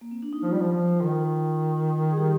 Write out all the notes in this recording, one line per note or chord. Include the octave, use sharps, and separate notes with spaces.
A#3
C4
D4
D#4
F3 F4
G3
F3
F3
D#3
G#4
G3 G4